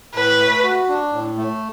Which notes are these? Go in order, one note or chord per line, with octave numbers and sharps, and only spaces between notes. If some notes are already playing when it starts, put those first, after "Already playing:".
A2 B4
A3
F#4
D4
A2
A3